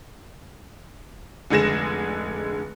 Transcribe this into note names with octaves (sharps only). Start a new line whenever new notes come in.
F1 D3 G#3 G#4 A#6 E7